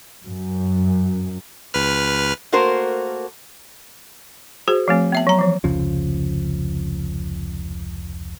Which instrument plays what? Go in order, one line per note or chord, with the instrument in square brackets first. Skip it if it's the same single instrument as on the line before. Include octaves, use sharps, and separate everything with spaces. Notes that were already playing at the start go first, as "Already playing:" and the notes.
[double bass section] F#2
[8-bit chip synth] C#2 B4 F6
[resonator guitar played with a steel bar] A3 A#3 F#4 A#4 C5
[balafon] F#4 G#4 C5
F3 A3 C4
B3 E5 A5
F#3 A#5
E3 F3
[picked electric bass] F1 C#2 C#3 F3